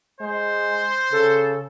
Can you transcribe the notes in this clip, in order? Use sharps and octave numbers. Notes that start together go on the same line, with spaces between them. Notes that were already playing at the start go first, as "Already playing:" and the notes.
G#3 C5
C#3 A4